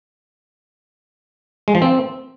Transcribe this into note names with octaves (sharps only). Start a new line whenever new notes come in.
G#3
F3
C4